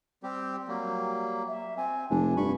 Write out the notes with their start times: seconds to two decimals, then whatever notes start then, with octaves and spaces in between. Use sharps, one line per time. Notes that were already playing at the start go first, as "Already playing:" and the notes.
0.23 G3 C4 G4
0.68 F#3 G3 A#3
1.48 E5
1.77 C4 G#5
2.10 F1 D4 G#5
2.37 G2 B5 C#6